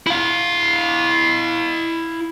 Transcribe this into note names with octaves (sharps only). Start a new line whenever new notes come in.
E4 F5